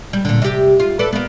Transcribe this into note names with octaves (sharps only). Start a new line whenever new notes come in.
G3
A#2 D3
C3 G4
F4
A4 B4 D5
A#3 B3